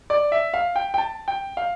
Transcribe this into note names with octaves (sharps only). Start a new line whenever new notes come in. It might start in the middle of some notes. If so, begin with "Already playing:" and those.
D5
E5
F5
G5
G5
A5
G5
F5